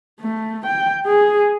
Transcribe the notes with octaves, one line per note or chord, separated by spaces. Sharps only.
A3
G5
G#4